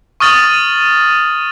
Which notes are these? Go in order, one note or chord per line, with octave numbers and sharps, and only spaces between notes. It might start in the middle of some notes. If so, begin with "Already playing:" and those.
C#6 D#6 F6 A6 D#7 F#7